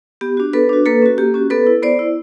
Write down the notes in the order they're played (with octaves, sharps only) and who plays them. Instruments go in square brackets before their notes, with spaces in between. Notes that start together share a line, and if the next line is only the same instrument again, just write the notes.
[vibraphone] B3 G4
D4 F#4
B3 A4 B4
D4 F#4
A#3 A4 B4
C#4 F#4
A#3 G4
C#4 F#4
B3 A4 B4
E4
B3 C5 D5
E4